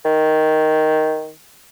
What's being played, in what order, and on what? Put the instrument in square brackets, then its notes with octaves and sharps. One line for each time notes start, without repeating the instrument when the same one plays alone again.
[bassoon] D#3